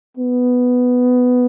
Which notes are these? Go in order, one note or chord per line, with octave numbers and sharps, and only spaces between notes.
B3